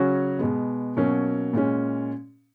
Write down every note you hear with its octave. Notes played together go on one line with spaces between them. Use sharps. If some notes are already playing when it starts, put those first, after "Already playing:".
Already playing: C#3 F#3 C#4 F#4
B2 G#3 B3
B2 F#3 A#3 C#4
A#2 G#3 C#4